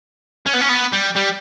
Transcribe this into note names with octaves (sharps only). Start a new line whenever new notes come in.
C#4
B3
C#4
B3
G3
G3